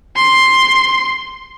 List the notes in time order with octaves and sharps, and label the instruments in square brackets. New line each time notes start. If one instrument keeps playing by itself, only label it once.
[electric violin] C6